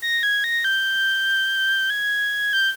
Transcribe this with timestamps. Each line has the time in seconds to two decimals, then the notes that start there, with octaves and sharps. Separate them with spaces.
0.02 A#6
0.23 G#6
0.44 A#6
0.64 G6
1.90 G#6
2.53 G6